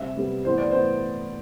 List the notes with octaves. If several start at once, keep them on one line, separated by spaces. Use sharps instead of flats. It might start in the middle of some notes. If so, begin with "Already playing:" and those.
Already playing: C3 G3 E5
C3 G3 B3
A2 E3 B3 C5
D5
A2 E3 B3 C5